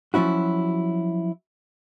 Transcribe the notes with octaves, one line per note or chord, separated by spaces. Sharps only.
F3 F#3 C#4 E4 F#4